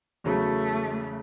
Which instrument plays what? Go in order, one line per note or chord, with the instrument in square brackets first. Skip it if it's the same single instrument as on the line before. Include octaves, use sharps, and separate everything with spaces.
[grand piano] E2 C#3 F#3 [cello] A3